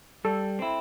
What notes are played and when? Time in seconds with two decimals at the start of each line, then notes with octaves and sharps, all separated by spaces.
0.25 G3 A4
0.59 C4 E4